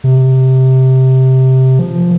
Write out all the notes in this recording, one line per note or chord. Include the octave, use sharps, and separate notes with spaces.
C3
F3